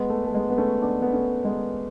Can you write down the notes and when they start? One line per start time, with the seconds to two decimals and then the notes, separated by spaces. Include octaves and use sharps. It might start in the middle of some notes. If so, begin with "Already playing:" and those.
Already playing: G#3 B3
0.10 A3
0.26 A3
0.34 G#3 B3
0.50 B3
0.58 A3 C#4
0.82 B3 D4
1.02 B3
1.13 A3 C#4
1.45 G#3 B3